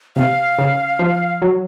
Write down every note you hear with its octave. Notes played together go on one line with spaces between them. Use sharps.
C3 F5
C#3
F3
F#3